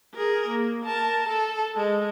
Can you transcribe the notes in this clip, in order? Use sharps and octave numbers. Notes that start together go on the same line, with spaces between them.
G#4 A#4
A#3
A#4 A5
A4
G#3